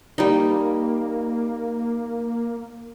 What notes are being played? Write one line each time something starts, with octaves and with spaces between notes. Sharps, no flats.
G3 A#3 D#4